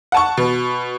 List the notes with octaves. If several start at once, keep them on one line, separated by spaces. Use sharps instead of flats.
F#5 A5 C#6
B2